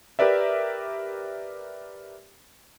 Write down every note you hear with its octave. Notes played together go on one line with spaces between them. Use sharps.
G4 A#4 B4 D5 E5